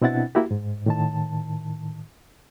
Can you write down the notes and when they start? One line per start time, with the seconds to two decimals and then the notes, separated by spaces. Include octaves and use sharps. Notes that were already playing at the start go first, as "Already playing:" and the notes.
0.02 B2 C4 D4 E4 F#5 A6
0.35 A#3 E4 F#4 G4
0.51 G#2
0.86 A2 D#3 A5